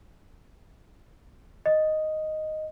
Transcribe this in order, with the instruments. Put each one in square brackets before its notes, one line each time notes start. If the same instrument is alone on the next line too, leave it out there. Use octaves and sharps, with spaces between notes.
[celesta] D#5